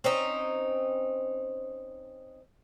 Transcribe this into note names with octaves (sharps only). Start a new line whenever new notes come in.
C4 C#4 D#4